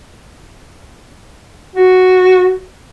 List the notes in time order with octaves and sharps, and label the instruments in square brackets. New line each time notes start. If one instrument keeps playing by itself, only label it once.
[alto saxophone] F#4